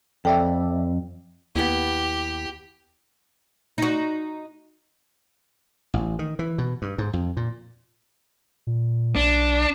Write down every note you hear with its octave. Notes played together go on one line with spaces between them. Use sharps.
F2 A4 D5 E5 G5
D#2 B3 E4 G4
D#4 F#4
A1
D#3
E3
B2
G2
G#2
F2
A#2
A#2
B1 D4